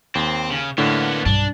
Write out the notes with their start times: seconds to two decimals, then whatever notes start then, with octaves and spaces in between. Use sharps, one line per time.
0.15 D#2 C4
0.51 C#3
0.78 A2 D3 A#3 B3
1.26 B1 G2 D4